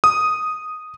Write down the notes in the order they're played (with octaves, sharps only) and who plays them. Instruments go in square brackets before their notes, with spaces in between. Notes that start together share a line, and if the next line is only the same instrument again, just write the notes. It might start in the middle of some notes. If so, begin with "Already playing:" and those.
[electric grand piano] D#6